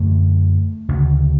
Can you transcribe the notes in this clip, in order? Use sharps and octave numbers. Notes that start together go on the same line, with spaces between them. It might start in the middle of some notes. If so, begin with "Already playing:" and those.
Already playing: F#2 D3 A3
D2 C#3